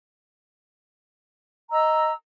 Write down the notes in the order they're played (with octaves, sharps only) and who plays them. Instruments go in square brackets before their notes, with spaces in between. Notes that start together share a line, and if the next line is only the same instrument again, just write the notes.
[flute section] D#5 A#5 E6